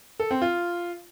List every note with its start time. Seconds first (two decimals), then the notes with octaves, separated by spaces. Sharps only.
0.20 A4
0.31 C4
0.42 F4